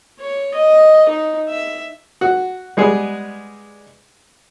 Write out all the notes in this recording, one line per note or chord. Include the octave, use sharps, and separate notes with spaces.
C#5
D#5
D#4
E5
F#4
G3 G#3 B3 G#4 B4